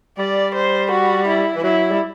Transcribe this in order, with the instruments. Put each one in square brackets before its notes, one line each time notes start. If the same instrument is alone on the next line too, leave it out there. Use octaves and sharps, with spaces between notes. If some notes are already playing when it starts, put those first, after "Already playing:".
[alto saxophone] G3 [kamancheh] D5
[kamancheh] C5
F#4
E4
[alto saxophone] E3
[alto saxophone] F#3 [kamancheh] E4
[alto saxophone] G3